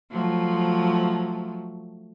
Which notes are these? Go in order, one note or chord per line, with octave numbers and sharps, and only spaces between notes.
F3 F#3 A3